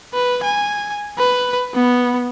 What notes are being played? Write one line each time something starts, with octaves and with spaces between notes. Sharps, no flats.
B4
G#5
B4
B3